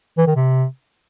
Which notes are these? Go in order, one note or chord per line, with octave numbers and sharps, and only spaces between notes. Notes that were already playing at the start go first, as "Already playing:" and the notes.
E3
D#3
C3